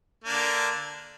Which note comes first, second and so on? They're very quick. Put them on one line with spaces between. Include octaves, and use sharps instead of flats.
A#3 D4 D3